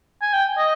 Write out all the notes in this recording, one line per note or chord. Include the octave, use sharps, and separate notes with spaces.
G#5
G5
D#5